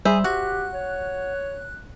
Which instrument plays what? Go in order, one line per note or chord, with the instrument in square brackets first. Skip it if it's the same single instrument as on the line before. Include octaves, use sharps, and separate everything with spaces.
[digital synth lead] G3 [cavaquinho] G#4 [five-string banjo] C5 E5
[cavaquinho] F#4 [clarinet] G4 [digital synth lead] F#6
[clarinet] C#5